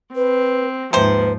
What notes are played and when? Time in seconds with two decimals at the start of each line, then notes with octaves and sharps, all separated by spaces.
0.16 C4 B4
0.93 D#2 G#2 C3 F3 B4 C5